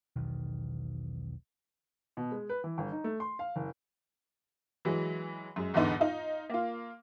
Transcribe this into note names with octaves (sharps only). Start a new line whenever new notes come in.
E1 B1 D#3
B2
G#3
B4
E3
G1
D#4
A3
C6
F5
F#1
E3 F#3 G#3
F#2 G#3
E2 G#2 B2 D3 B3 D#4
D#4 F4
A#3 F4